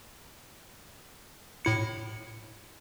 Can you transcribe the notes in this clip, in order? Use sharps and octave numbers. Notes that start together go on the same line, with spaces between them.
A2 E4 C#7